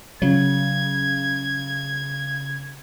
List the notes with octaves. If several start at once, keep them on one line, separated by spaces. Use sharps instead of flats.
C#3 F#3 G#6